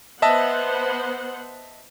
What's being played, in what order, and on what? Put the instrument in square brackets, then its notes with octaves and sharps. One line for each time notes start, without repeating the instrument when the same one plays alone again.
[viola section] B3 C5 F#5 [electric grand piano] D#5 E5 A5